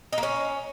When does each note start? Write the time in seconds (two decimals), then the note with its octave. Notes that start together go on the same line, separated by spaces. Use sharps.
0.13 D#4
0.18 A#3
0.23 C#4